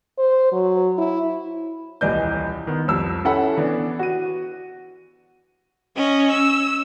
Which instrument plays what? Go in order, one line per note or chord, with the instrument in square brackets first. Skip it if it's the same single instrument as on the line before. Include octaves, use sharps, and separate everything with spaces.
[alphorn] C5
F#3
E4
[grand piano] D#1 C2 E3 D5 D#5 G6
D#3 B3
C2 F2 E6
C#4 E4 A4 F#5 B5
E3 B3 D4
F#4 D#7
[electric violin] C#4 D#5
E6